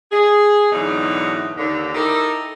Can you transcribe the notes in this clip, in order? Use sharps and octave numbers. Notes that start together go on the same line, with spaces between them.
G#4
G#2 B2 D3 E3 F#3 D#4
D#2 D3
D#4 E4 G4 A4 A#4